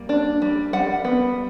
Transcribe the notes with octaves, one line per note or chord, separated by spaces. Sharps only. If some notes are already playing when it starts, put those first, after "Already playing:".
Already playing: G3 A#3
D4
G3
G3 F#5
B3